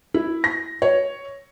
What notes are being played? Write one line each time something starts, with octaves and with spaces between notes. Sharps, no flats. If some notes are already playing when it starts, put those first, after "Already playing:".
E4
A#6
C#5